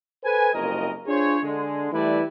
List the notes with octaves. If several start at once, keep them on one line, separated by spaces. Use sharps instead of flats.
A4 B4 C5 G#5
F#1 C2 F2 A#4 D#5
D4 F4 G#4 C5 C#5
D3 G#3
E3 G3 A3 E4 B4 D5